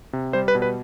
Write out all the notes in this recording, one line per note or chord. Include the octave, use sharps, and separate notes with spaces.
C3
G3 C5
B4
B2
B4